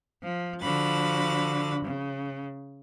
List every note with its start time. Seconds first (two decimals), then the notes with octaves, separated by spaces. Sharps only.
0.22 F3
0.62 D3 F3 F#4 B5 A6
1.84 C#3